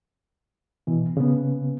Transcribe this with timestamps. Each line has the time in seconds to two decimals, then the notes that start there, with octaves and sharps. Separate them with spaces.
0.87 B2 E3
1.17 C#3 B3